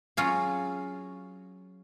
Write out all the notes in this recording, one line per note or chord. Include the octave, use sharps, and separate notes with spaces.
F#3 C#4 F4 G#4